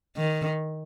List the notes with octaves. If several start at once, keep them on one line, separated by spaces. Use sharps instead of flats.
D#3